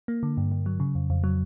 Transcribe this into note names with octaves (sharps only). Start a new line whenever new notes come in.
A#3
D3
G2
G2
F#3
C#3
F2
F2
F#3